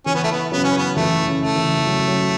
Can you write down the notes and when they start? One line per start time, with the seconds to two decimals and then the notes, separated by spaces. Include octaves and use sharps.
0.06 E3 C#4
0.15 B3
0.24 A3
0.32 B3
0.52 C#3 F#3 B3
0.64 C#4
0.78 B3
0.96 E3 A3
1.26 C#3
1.41 A3
1.56 E3
1.85 C#3 F#3
2.08 C#3 F#3